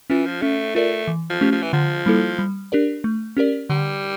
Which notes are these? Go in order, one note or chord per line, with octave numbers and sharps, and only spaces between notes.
E3 C#4 F4
F3
A3 C#4
A3 F4 A#4 D5
E3
F3
A3 C#4 G4
F3
E3
D3 F3
G3 A#3 E4 A4
G3
D4 G4 A#4 D5
A3
C#4 G4 A#4 D5
D3 G3